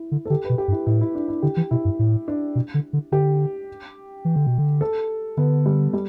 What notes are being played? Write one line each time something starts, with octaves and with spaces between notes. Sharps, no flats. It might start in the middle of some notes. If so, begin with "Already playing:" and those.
Already playing: E4
D3
A4
D3 G4
B4
B2
G4
G2
E4
A2 E4
E4
D4
E4
D3 G4
E3
B2 E4
G2
A2
D4
B2
D3
D3
D3 G4
E3
D3
B2
D3
A4
D3 B3
G3
G3